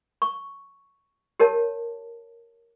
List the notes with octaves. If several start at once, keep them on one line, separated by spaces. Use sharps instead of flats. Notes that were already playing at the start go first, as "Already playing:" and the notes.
C#6
G4 A#4 C#5 A5